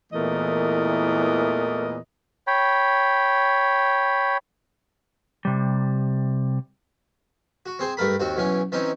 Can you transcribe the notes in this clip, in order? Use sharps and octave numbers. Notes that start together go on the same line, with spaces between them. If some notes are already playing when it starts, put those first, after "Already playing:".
E2 A#2 E3 A3 A#4 D#5
C#5 G5 B5
C3 G3
F#4
C4 G#4 C5
G2 A3 A#4 B5
D#2 C4 F#4
B1 E3 C#4
E3 C4 C#4 D#4